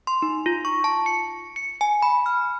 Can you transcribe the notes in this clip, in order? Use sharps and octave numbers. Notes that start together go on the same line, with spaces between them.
C6
D#4
F4
C#6
A5
C#7
C#7
G#5
B5
F6